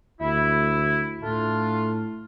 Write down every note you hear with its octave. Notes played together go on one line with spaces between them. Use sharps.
D2 E4
A2 A3 D4 F4